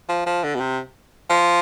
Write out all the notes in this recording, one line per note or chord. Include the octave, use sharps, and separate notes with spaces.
F3
F3
D3
B2
C3
F3